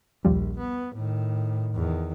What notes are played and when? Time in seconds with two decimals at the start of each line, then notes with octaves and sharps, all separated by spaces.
0.25 A#1 D#2 F3 G3
0.59 B3
0.95 A2 D#3
1.74 E2 D#3